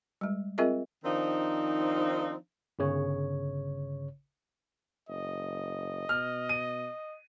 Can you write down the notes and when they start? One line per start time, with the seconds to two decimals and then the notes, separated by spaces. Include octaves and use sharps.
0.21 G3 G#3
0.58 C4 F4 G#4 A#4 D#5 E5
1.04 D#3 F3 C4 D4 D#4
2.79 G1 C#3 C#5
5.09 F#1 D#5
6.09 B2 F6
6.49 D#7